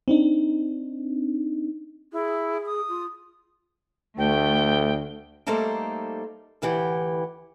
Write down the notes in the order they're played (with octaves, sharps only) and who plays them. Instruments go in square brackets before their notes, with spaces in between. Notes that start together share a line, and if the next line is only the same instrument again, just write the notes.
[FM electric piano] C4 D4 D#4
[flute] E4 [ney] G#4
[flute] D#6
[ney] F4
[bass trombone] D2 [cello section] A3 [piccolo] G5
[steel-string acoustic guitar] G3 A3 A#3 D#4 A4 C5
D2 A2 E3 G4 F#5